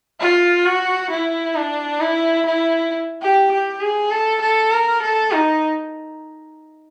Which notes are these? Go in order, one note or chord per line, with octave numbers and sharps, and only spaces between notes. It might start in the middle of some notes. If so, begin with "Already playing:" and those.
F4
F#4
E4
D4
E4
E4
G4
G4
G#4
A4
A4
A#4
A4
D#4